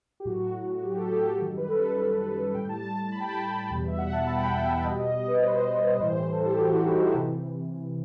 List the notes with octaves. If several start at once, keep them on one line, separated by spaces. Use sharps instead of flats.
G4
A2 F#3 F#4
G4
A4
G4
F#2 D#3 G3
B4
A4
A2 G3 G5
A5
A5
B5
G5
A5
E2 B2 G3
E5
F#5
A5
B5
G5
F#5
E5
B2 G3 D#5
D#5
D#5
B4
C5
A2 E3 G3 C5
A4
G4
F#4
E4
D#4
F#4
C3 E3 G4